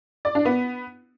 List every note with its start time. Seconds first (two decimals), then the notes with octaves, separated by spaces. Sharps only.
0.25 D5
0.35 D4
0.45 B3